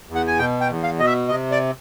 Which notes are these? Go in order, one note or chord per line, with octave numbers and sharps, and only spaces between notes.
E2
F#5
G#5
B2 G5
G5
E2
F5
B2 D#5
E5
C3 D#5
D5